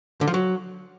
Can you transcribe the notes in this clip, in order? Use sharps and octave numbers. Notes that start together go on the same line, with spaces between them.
D3
F3
F#3